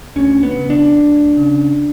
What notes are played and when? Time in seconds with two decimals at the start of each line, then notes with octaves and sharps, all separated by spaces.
0.16 D2 C#4
0.43 B3
0.56 C#3
0.70 D4
0.97 D2
1.37 C#3